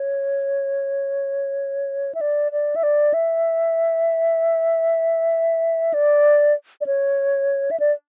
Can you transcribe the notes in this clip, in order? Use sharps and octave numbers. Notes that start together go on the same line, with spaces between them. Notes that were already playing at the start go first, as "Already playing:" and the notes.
Already playing: C#5
E5
D5
D5
E5
D5
E5
D5
D5
C#5
E5
D5